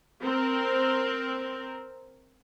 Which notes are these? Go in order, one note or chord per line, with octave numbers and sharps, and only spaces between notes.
C4 A#4